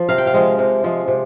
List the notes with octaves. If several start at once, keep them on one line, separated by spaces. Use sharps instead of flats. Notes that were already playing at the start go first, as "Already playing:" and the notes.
Already playing: F3
C3 F5
G5
F5
F3 G#3
C3
F3 G#3
C3